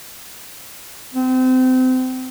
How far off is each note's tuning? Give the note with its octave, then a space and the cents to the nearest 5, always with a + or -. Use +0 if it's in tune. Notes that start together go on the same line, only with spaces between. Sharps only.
C4 -30